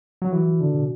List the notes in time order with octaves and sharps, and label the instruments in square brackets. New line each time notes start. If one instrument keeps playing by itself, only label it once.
[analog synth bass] F#3
[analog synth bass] E3 [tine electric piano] F#4
[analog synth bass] D3
[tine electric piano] B2